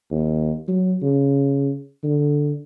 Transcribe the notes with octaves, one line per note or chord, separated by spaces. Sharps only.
D#2
F#3
C#3
D3